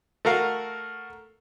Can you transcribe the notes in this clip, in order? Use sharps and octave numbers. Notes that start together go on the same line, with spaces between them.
A3 F#4 A#4 F5